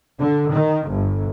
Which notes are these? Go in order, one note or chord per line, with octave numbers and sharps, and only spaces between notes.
D3
D#3
G1